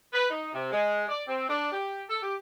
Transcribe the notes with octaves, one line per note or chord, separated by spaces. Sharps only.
B4
D#4
C3
G#3
D5
C4
D4
G4
A4
G4